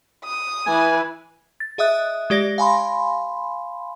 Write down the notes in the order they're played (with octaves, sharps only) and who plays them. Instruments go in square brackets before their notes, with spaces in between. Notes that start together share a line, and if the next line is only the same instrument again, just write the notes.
[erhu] D#6
[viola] E3 B4 [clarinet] G#5
[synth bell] A6
G#4 D#5 E5 D#6 F#6
G#3 G4 D5 A#6
F5 G#5 B5 C6